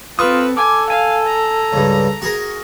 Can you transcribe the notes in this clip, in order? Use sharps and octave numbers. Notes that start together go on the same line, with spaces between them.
C4 F4 A4 B4 C#6 D#6
A4 G#5 D6
F5 G#5
A#5
C#2 G2
F#4 G#4 A#4